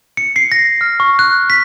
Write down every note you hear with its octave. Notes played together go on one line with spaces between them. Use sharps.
C#7
C7
A#6
F6
C#6
F#6
B6